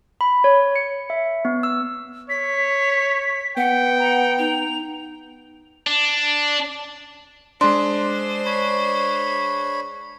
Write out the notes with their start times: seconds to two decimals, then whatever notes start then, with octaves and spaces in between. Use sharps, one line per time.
0.21 B5
0.44 C#5
0.76 C#7
1.10 E5
1.45 B3
1.63 E6
2.30 C#5 B6
3.57 B3 F#5 G5
3.99 A#5
4.38 D#4 F7
5.87 D4
7.61 G#3 D4 C5 C6
8.46 C#5 B5